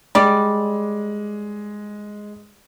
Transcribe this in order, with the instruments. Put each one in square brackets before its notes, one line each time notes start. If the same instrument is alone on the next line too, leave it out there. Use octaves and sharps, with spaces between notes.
[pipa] G3 D5 [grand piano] G#3